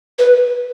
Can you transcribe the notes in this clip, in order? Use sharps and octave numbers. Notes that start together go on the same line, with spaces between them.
B4